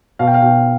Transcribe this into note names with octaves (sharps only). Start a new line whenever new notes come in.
B2 F5
G5
F5
B2 G5